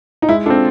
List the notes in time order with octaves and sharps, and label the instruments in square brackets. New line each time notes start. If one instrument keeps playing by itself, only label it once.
[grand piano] D#4
[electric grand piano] G#3 [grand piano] E4
[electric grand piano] C4 F4 A4 [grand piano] D4